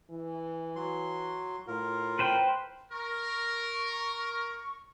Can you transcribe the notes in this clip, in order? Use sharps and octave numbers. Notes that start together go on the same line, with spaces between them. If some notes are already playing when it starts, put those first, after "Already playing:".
E3
F#3 C6
A2 F4 A#4
B4 C5 G5
A#4 C#6